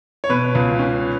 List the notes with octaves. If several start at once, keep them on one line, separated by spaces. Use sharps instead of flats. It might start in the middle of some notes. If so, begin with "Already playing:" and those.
C#5
B2 B4
C#2
C#4